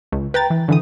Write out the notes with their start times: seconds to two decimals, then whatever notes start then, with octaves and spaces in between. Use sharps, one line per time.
0.12 C#2
0.34 B4 G5 A#5 A6
0.50 E3
0.68 D3 E3 D#6